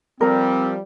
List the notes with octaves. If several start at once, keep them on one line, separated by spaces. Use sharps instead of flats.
F3 G3 C4 A#4